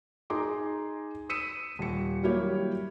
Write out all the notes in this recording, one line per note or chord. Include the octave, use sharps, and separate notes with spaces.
D#4 G#4 A#5 C6 D6
D#6 E6 B6 C#7 D#7 E7
D#1 C#7
F#3 G3 A#3 E4 G4 C#5